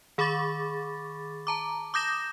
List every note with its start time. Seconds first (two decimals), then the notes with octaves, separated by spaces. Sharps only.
0.18 D#3 G#4 B5 C#6 D6 A6
1.47 A5 A#5 D6
1.94 D6 D#6 G6 A#6 E7